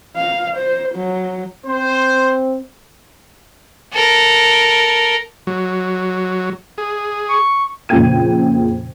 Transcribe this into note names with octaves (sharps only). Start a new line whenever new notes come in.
F5
C5
F#3
C4 C5
A4 A#4
F#3
G#4
C#6
F2 A#2 C#3 G5 G#6 D#7